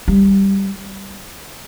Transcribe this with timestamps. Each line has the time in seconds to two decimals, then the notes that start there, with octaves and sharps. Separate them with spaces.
0.08 G3